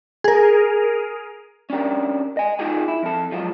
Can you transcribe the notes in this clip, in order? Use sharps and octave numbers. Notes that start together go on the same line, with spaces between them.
G#4 A#4
C#4 D4 G4 A#4
D#5 G#5
D#4 F4 G4 G#4 G#5
E4
F2 A4
F3 F#3 G#3 F4